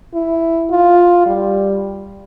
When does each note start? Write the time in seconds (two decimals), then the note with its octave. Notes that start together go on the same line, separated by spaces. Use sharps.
0.14 E4
0.71 F4
1.26 G3